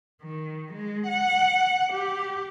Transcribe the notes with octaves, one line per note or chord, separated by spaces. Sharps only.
D#3
G#3
F#5
G4